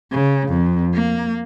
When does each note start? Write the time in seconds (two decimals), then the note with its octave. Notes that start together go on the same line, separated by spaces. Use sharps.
0.11 C#3
0.49 F2
0.94 A#3